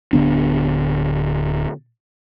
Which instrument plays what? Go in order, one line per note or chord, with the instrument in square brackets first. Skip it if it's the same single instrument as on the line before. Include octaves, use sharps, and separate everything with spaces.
[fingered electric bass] D1 D3 B3 D4